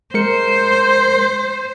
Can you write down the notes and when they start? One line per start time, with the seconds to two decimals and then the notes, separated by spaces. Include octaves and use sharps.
0.14 G#3 A#4 C5 C#7